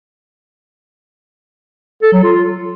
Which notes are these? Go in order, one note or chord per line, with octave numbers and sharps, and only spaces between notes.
A4
F#3
F4